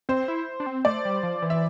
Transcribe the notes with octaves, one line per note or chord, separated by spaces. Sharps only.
C4 C5
E4
D4
C4
A3 D5
G3
F3
E3
E5